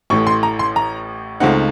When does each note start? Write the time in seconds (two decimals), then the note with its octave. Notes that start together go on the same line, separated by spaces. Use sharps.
0.10 A1 A2 A3 C#6
0.27 C6
0.43 A#5
0.59 C6
0.76 A#5
1.40 C#2 C#3 A3 C4 D#4 F#5